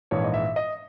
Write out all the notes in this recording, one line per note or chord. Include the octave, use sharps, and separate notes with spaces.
A#1 G#2 E3 C#5
D#5
E5
D#5